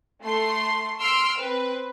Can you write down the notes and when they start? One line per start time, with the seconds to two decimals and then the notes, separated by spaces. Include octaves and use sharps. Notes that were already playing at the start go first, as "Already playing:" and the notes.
0.23 A3 C6
1.00 C6 E6 F6 C7 D7
1.37 C4 B4